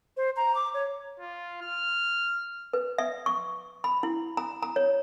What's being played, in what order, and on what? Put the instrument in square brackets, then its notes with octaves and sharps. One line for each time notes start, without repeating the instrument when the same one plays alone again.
[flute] C5
A#5
D6
C#5
[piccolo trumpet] F4
F6
[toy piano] B4
E5
C#6
B5
E4
A#5
A#5
C#5